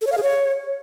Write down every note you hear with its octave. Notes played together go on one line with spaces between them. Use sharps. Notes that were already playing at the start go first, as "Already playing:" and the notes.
A4
C#5
F5
G#4
C#5